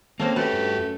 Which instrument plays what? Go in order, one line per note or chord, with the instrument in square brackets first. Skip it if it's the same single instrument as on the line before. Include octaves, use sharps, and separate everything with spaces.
[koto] A3 C#4 C5 [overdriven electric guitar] A#3 [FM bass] C4
[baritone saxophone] A3 [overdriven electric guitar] F#4 G4 [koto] B4
[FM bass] G2
F#2